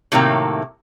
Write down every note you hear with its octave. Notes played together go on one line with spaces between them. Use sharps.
A2 C3 D#3 F#3 A#3